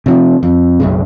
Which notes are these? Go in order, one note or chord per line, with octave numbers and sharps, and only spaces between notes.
C3 F3
F2
F#1 B1 C#3